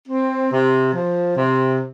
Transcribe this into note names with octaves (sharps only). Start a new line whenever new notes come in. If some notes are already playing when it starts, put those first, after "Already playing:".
C4
C3
F3
C3